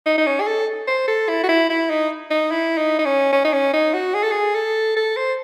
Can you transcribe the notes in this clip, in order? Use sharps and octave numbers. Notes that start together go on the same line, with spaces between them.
D#4
D#4
C#4
G#4
A4
C5
A4
E4
F#4
E4
E4
D#4
D#4
E4
D#4
D#4
C#4
C#4
D#4
C#4
D#4
F#4
G#4
A4
G#4
A4
A4
C5